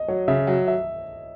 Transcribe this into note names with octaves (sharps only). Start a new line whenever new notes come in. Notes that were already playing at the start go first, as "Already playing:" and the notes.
Already playing: D#5
F#3 C#5
C#3 E5
F#3
E5